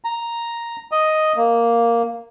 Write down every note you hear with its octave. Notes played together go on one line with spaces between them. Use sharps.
A#5
D#5
A#3